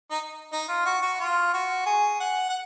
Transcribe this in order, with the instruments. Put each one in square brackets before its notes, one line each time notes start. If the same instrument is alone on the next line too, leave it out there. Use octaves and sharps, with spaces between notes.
[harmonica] D#4
D#4
F4
F#4
F#4
F4
F#4
G#4
F#5
F#5